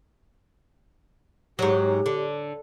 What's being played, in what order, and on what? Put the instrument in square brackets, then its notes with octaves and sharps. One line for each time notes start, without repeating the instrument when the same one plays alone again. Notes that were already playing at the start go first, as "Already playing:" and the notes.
[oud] G#2 F#3 [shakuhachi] G4
[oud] D3